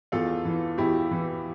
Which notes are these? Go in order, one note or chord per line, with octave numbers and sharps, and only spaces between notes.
E2 F4 A4
E3
E2 E4 G4
E3